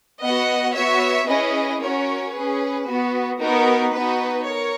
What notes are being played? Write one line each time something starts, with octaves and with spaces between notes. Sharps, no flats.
B3 F#4 D#5 F#5
B3 F#4 C#5 E5
C#4 E4 G#4 B4 D#5
C#4 F#4 A#4 C#5
C#4 G#4 B4
B3 F#4
B3 D#4 F#4 A#4
B3 D#4 F#4 B4
A#4 C#5